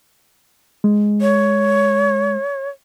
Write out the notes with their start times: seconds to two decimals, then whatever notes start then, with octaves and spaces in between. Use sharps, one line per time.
0.84 G#3
1.21 C#5